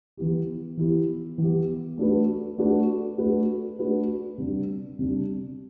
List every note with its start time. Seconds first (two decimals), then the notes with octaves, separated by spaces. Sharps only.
0.17 E3 B3 E4 G4
0.77 E3 B3 E4 G4
1.38 E3 B3 E4 G4
1.98 A3 D4 F#4 B4
2.58 A3 D4 F#4 B4
3.18 A3 D4 F#4 B4
3.79 A3 D4 F#4 B4
4.38 C3 G3 D4
4.99 C3 G3 D4